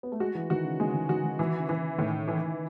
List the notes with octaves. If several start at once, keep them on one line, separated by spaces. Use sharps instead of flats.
B3
A3
G#3 F#4
E3
D#3 F#4
C#3
C#3 G#3
D#3
D#3 F#4
D#3
D#3 E3
C#3
E3
A2 D#3
E3